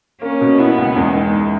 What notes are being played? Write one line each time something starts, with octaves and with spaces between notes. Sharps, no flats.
A#3 C#4
B2
B3 E4
C#2
E2 G#3
D#3